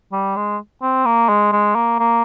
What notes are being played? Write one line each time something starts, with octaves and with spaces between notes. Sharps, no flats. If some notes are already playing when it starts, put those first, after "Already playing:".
G3
G#3
C4
A#3
G#3
G#3
A#3
A#3